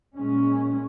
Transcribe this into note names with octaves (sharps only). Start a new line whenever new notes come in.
A#2 G#3 C#4